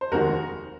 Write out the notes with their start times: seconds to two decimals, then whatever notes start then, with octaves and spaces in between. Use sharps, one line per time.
0.01 C5
0.11 F1 D#2 D#3 G#3 F#4 A#4